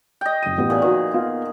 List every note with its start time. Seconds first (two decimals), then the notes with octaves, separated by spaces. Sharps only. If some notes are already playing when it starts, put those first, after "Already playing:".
0.21 D#5 G5
0.43 F#1 D#7
0.58 A1 B3 G4
0.70 A#2 G#4
0.82 D#3 F3 F#4 B4
1.14 B3 F4 F5